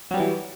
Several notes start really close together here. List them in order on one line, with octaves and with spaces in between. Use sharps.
F#3 G3 B3 E3